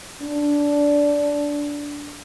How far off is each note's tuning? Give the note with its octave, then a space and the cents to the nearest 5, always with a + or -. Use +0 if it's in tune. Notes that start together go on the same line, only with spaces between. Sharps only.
D4 -15